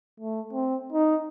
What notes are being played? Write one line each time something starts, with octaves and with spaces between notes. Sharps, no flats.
A3
C4
D#4